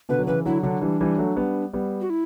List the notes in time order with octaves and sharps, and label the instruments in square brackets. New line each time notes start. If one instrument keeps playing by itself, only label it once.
[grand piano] B2 D3 [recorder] B4
[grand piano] F#3
[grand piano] C#3 E3 [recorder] B4
[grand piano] D3 F#3 [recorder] E4
[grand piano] D3 F#3 [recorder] D4
[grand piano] E3 G3
E3 G3
F#3 A3
G3 B3
G3 B3
[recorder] F#4
E4